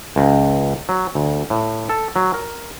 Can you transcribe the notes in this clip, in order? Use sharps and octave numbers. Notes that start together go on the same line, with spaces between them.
C#2
F#3
D2
A2
A4
F#3
A#4